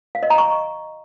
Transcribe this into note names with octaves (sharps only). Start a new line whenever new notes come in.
F5
D#5
A#5
C#6